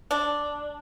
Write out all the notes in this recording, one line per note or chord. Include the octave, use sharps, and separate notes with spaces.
D4